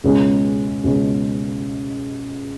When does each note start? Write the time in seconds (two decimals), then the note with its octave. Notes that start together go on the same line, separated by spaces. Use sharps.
0.04 C#2 B2 G#3 C#4
0.83 C#2 B2 G#3 C#4